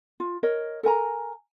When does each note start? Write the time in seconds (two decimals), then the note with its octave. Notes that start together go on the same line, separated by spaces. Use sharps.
0.20 F4
0.43 A#4 C#5 D#5
0.83 A4 A#4 G#5 A#5